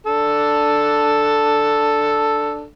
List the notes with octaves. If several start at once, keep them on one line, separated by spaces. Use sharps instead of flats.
D4 A4